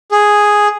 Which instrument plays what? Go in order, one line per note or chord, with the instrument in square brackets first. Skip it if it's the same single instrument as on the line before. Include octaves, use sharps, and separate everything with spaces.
[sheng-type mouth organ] G#4